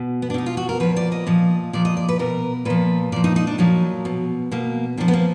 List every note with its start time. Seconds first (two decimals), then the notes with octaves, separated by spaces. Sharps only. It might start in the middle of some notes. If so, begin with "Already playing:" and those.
Already playing: B2
0.22 B3
0.30 D4
0.34 B2 D#4
0.46 F4
0.57 F#4
0.69 A#4
0.80 A#2 F3 B4
0.96 D5
1.12 D#5
1.27 A#2 F3
1.73 A#2 F3 D5
1.85 D#5
1.97 D5
2.09 B4
2.19 B2 A#4
2.65 A#2 F3 B4
3.12 A#2 D5
3.16 F3
3.24 D#4
3.36 D#4
3.47 D4
3.58 A#2 F3 F#3
4.05 B2
4.52 B2 A#3
4.97 A#2 F3 D4
5.08 B3
5.14 A#3